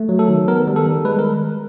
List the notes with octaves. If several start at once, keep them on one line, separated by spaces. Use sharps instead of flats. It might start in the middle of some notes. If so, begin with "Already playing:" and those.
Already playing: A3
F#3
A4
D#3
B3 A#4
G3
A4
D#3
G#3 B4
A#4